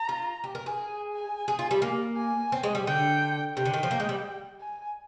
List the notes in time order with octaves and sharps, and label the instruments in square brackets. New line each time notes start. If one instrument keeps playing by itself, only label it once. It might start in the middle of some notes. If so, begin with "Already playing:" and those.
Already playing: [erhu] A#5
[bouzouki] F4
G4
A#4
G#4
[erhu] G#5
G#5
[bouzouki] G#4
F4
G3
A#3
[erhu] G#5
[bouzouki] C4
G#3
G3
[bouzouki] D3 [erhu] G5
[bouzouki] C3 [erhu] G5
[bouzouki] D3
D#3
F3
A#3
G#3
G3
[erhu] G#5